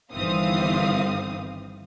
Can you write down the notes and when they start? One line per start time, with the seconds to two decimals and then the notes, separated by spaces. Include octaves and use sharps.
0.13 G1 D#3 E3 C4 F5 D#6